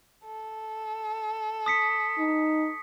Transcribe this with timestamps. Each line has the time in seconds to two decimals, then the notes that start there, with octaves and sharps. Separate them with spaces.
0.25 A4
1.66 D#6 B6 C#7
2.18 D#4